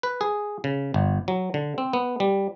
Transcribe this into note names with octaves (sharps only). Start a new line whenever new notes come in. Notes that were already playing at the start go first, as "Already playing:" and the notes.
B4
G#4
C#3
G1
F#3
D3
C4
B3
G3